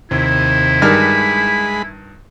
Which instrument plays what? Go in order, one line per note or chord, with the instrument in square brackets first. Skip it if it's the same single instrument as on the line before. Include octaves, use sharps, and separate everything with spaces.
[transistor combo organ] D#2 C3 [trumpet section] E4
[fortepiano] G2 D#3 F6 [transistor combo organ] G#3 B5